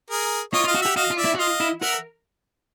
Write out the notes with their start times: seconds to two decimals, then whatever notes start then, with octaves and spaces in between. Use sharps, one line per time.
0.11 G#4 A#4
0.54 F4 C#5 D#5
0.65 F4
0.68 D#5 F5
0.75 F#4
0.82 G4 E5 F#5
0.96 F#4 D#5 F5
1.11 F4
1.17 D5 E5
1.25 E4
1.35 F#4
1.39 F4 D#5 F5
1.60 E4
1.82 A#4 E5 F#5